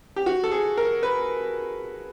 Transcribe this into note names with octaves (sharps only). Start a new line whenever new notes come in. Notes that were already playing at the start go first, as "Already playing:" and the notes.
G4
F#4
A4
G#4
A#4
B4